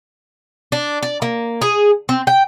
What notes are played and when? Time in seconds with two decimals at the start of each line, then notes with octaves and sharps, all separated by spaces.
0.72 D4
1.03 D5
1.22 A#3
1.62 G#4
2.09 C4
2.27 G5